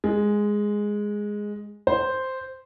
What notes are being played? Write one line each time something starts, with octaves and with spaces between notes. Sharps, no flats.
G#3
C5